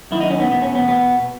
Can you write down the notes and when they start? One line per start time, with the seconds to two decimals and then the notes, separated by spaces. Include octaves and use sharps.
0.11 F#2 D#3 E4
0.20 D#4
0.30 C#4
0.40 B3
0.50 E2 B2 B3
0.62 C#4
0.75 B3
0.88 B2 B3